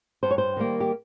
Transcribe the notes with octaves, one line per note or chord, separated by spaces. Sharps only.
G2 C5
C#5
C5
D#3 G3 A#3
G4